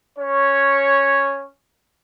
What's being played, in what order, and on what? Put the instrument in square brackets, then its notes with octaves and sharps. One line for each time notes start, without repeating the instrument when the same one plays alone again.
[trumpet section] C#4 C#5